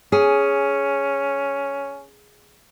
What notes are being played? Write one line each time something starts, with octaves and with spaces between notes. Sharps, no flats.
C#4 G#4